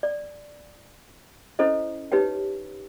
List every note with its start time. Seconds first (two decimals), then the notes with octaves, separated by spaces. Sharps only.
0.03 D5
1.59 C#4 E4 A4 C5 D#5
2.12 D#4 G4 B4 C#5 G5